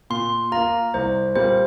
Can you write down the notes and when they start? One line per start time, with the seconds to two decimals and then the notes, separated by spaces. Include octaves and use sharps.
0.10 A#2 C6
0.52 A#3 F4 A#5
0.94 C2 C5
1.35 A#2 G3 A#3 C5